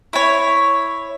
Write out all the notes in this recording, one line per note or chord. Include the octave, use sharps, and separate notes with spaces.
E4 C#5